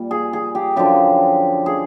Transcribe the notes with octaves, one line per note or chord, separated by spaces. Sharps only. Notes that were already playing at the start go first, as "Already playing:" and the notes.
Already playing: A#2 G3
G#4
G#4
G4
F#2 D3 F3 G4
G#4